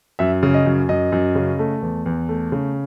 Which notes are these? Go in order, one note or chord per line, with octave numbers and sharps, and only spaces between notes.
F#2 E5
C#3
D#5
F#2
F#2 D#5
F#2
C#3
A3
E2
E2
A3
C#3